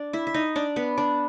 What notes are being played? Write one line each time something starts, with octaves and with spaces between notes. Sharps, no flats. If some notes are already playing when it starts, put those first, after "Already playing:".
Already playing: D4 D5
E4 E5
E5
D#4 D#5
D4 D5
B3 B4
D4 D5